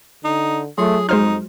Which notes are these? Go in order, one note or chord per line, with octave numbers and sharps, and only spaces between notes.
D3 D#4
F#3 A3 F4 G#4
F2 G#3 D#4 F#4 C5 F6